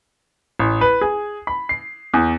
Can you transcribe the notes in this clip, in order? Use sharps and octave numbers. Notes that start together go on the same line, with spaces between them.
A1
B4
G#4
B5
C7
E2